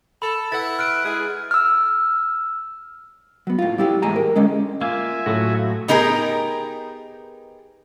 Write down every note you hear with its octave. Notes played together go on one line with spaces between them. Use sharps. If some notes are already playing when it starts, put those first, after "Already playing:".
A4 B5
E4 B4 F#5 A6
F6 F#6 D7
G#3 E4 G#4
E6 F6
F#3 B3
A2 F4
G3 E4 G4
E2 A2 G#3 G#5 A#5
A#4
D3 G#3 C#4
A#3 F4 E5 G#5
A2 F#3 F#4
B3 D#4 G4 G#4 A#4